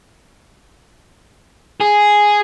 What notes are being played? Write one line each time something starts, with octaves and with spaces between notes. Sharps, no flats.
G#4